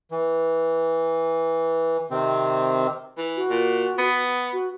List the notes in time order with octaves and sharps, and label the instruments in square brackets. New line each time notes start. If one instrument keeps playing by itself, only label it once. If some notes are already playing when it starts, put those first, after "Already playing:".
[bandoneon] E3
C3 D#3 C4
[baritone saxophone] E3
[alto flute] F#4
[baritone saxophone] A#2
B3
[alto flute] F#4